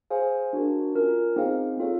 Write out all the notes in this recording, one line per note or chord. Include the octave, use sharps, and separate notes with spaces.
G#4 C5 F5 G#5
D4 F#4 A#4
C#4 F4 A#4
C4 D#4 G#4 C5 F5
C4 F4 A4 C#5 F5